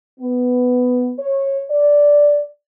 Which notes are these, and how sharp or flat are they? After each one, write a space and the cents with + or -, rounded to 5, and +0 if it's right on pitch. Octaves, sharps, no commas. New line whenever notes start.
B3 +10
C#5 -20
D5 -5